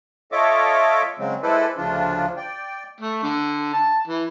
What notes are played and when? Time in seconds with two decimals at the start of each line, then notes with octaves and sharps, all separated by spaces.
0.32 F4 A4 C#5 D#5 E5 D6
1.19 C#3 F#3 G#3 C4
1.43 G#3 E4 A4 B4 C5 D5
1.77 D2 C#3 F3 D4 F4
2.37 D5 G5
3.00 A3
3.23 D3
3.74 A5
4.08 E3